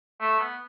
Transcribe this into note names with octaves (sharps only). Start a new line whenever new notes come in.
A3
B3